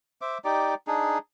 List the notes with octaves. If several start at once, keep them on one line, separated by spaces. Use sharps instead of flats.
C5 E5 D6
D#4 G4 D5
D4 D#4 G#4